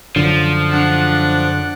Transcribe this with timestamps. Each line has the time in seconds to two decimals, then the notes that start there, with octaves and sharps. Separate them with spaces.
0.16 F#2 D3 F3
0.70 D4 F#5